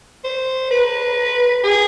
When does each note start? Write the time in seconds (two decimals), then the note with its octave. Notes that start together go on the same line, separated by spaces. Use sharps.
0.24 C5
0.71 B4
1.64 G#4